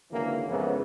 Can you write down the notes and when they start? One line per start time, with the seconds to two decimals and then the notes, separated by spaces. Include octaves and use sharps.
0.11 C#2 G#2 D3 E3 F#3 A#3
0.49 F2 G#2 C#3 E3 B3 C#4